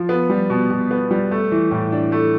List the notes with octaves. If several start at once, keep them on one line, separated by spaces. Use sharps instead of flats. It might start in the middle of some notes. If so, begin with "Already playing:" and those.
Already playing: F3
B3
G3
B2
B2
B3
G3
A3
E3
A2
D4
A3